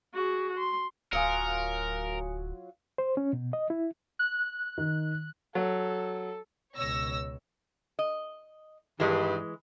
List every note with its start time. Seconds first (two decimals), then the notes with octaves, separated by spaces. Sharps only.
0.14 F#4 G#4
0.58 C6
1.13 D1 F#3 F4 A#4 G#5 D#6 C#7
2.98 C5
3.17 C#4
3.33 B2
3.53 D#5
3.70 E4
4.19 F#6
4.78 D#3
5.55 F#3 A4
6.75 C#2 B2 C#5 E6 A#6
7.99 D#5
9.00 G2 D#3 E3 G#3